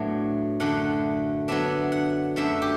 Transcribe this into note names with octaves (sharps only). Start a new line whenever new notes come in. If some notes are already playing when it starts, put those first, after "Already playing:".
Already playing: A2 F#3 A3 B3 D4
F#2 D3 A3 F#5
D3 F#3 B3 D4 E5
F#5
F#2 D3 A3 E5
G4